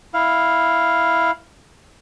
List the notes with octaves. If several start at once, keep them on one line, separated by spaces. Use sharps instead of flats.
E4 F5